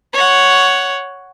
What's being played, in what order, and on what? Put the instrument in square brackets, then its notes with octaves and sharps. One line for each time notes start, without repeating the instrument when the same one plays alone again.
[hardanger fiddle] C#5 F#5